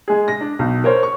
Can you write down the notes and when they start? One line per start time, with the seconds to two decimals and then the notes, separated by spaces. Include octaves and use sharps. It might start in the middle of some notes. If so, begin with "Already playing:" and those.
0.08 G#3 G#4
0.28 A#6
0.41 D4
0.59 B1
0.84 A#4 C5 C#5
1.03 C#6